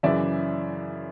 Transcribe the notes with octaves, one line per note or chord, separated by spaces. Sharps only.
F#2 C#3 E3 D5 E5